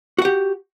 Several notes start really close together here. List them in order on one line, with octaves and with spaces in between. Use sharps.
F#4 F#5 G4